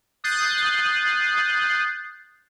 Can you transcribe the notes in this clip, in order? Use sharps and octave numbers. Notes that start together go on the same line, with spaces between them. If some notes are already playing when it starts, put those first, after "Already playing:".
D#6 F#6 G6 A6 C7